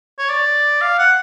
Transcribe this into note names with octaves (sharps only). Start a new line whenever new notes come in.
C#5
D5
F5
F#5